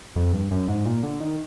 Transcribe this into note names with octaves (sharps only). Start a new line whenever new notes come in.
F2
G2
F#2
G#2
A#2
D3
D#3